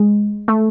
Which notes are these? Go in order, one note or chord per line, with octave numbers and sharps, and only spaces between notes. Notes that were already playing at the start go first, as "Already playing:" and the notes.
Already playing: G#3
A3